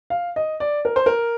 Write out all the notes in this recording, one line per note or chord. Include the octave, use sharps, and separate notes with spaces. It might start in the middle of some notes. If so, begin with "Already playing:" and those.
F5
D#5
D5
A#4
C5
A#4